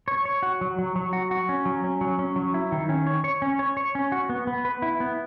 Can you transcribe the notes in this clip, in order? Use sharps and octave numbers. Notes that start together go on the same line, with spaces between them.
C#5
C#5
F#4
F#3
F#3
F#3
F#4
F#4
C#4
F#3
C#4
F#3
C#4
F#3
E4
D#3
C#4
C#5
C#5
C#4
C#5
C#5
C#4
F#4
B3
B3
B4
E4
B3